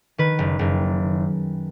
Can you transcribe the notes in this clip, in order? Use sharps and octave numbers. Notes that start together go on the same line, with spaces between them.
D#3 B4
F#1
F#1